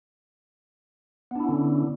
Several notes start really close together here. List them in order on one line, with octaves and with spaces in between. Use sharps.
B3 D4 E4 C#4 D3